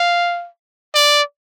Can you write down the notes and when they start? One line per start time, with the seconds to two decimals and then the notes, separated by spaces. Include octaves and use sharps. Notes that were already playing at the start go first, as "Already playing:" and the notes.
Already playing: F5
0.94 D5